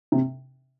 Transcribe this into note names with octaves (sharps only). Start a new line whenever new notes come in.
C3